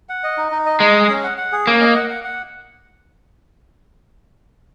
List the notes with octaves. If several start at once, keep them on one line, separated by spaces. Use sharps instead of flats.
F#5
D#5
D#4
D#4
D#5
G#3 D#5
G#4
C#4
F#5
F#5
G#4
A#3 C#4
D#5
F#5
F#5
F#5